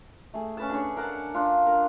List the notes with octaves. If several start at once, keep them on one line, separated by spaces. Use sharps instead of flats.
A3 G#4
C#4 B4 A5
D4 G#4 C#5
A#4 F#5 A5
D4 F4
A#4